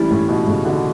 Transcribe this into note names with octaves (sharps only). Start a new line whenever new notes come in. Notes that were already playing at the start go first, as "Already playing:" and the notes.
Already playing: E3 G3 A3 C#4 E4
A2
B2
A2 C#3
B2 D3